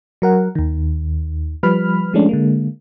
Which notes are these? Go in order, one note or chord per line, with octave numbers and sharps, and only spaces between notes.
F#3 A#4 F#5
D#2 D#3
F3 G3 B4 B5 F6
F3 G#3 A3 C#4 D4
D3 G#3 A#3